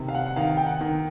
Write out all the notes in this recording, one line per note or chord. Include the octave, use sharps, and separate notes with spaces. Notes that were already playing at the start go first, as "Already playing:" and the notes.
Already playing: C3 D#3
F5
F#5
F#5
D#3 F5
G5
F#5
D#3